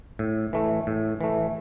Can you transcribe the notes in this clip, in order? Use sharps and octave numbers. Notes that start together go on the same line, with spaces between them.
A2
E3 A3
A2
E3 A3